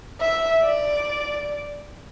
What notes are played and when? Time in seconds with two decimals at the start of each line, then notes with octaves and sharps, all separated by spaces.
0.20 E5
0.63 D5